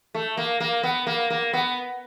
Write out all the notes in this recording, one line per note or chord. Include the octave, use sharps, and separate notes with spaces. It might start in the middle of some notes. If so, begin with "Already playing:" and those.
A3
A#3
A#3
B3
A#3
A#3
B3